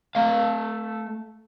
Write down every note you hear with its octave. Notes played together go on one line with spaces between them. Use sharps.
A3 F5